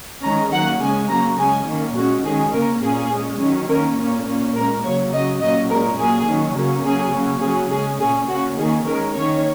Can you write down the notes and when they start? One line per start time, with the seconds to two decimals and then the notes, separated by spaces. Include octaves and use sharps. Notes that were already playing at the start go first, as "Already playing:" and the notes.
0.24 D#3 G#3 C#4 A#5
0.52 D#3 F#3 A#3 C#4 F#5
0.81 C#3 G#3 C#4 G#5
1.10 C#3 F#3 A#3 C#4 A#5
1.38 C#3 G#3 C#4 G#5
1.68 D#3 A#3 C#4
1.96 A#2 G#3 C#4 F#4
2.25 D#3 G#3 C#4 G#4
2.54 C#3 A#3 C#4 A#4
2.83 A#2 A#3 C#4 G#4
3.12 A#2 G#3 C#4
3.40 D#3 F#3 C#4
3.69 D#3 A#3 C#4 A#4
3.97 A#2 A#3 C#4
4.26 A#2 A#3 C#4
4.55 A#2 G#3 C#4 A#4
4.84 C#3 F#3 A#3 C#5
5.12 C#3 F#3 C#4 D#5
5.41 A#2 F#3 A#3 C#4 D#5
5.70 A#2 G#3 C#4 A#4
5.99 A#2 F#3 A#3 G#4
6.28 D#3 F#3 C#4
6.56 C#3 F#3 A#3 C#4
6.85 C#3 F#3 C#4 G#4
7.14 C#3 F#3 A#3 C#4
7.42 C#3 F#3 C#4 G#4
7.71 C#3 G#3 C#4 G#4
8.00 A#2 A#3 C#4 G#4
8.29 C#3 A#3 C#4 F#4
8.58 D#3 A#3 C#4 G#4
8.86 D#3 G#3 C#4 A#4
9.15 D#3 A#3 C#4 C#5